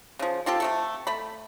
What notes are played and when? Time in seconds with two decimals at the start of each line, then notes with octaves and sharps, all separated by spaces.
0.19 C#3 F3
0.46 C4 F4 G4 A4
0.60 C3 A3 A4
1.07 A3 B5